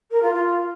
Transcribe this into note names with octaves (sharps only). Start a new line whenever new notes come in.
A#4
F4
F4